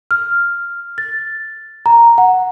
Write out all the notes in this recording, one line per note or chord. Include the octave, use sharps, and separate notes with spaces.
F6
A6
A#5
F#5